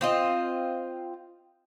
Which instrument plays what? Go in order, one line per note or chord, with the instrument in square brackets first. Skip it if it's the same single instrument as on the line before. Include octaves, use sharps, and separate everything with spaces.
[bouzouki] C4 F4 D#5